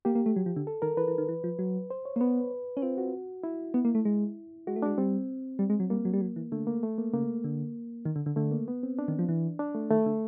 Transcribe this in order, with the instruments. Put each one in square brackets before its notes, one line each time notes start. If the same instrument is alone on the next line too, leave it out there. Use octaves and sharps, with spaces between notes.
[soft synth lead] A#3 [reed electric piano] G4
[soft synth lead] A#3
A3
F#3
F3
D3
[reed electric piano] A4
[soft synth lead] D#3 [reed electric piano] A#4
[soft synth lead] E3 [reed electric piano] B4
[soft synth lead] E3
D#3
E3
F3
F#3
[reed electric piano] C5
C#5
[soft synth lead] A#3
[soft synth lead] B3 [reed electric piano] B4
[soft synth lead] C#4
[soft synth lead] C4 [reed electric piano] F4
[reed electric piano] F#4
E4
[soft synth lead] B3
A#3
A3
G#3
[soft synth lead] G#3 [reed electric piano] F#4
[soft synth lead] A3
[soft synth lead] G#3 [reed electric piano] D4
[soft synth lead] G3 [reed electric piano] C4
[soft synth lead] G3
G#3
F#3
[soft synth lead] G3 [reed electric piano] A#3
[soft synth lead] F#3
G3
F#3
E3
[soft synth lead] D3 [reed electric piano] A3
[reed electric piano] A#3
A3
A#3
[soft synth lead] C#3 [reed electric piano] A#3
[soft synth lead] D3
D#3
D3
D3
[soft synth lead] D3 [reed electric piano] A3
[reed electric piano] A#3
B3
C4
D4
[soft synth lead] D#3
F3
E3
[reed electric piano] D4
A3
[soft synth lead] D#3 [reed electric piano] A3
[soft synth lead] D3